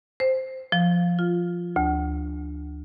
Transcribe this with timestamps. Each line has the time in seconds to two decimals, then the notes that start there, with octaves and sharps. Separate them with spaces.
0.20 C5
0.72 F3
1.19 F4
1.76 D2